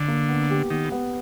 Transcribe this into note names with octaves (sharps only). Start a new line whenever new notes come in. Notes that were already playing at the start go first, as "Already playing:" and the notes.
Already playing: D3 D4
A#3
B3
G4
D#3 B3
B3